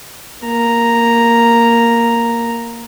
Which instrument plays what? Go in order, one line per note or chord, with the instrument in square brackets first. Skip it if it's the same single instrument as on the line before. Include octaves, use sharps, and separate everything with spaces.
[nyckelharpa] A#3 A#5